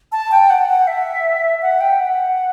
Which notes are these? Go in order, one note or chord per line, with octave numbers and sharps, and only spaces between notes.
A5
G5
F#5
F#5
E5
F#5
G5
F#5